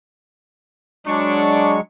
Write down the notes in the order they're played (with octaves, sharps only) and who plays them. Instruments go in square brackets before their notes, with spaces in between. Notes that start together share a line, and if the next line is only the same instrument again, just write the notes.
[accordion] F#3 G#3 C#6 [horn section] D4